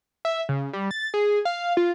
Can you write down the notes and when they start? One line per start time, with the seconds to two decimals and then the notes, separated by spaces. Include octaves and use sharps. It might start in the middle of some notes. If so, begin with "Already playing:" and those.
0.25 E5
0.49 C#3
0.73 G3
0.91 A6
1.14 G#4
1.45 F5
1.77 F4